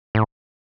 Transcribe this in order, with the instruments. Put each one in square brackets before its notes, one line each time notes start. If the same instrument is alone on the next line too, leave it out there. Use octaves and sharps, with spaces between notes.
[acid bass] A2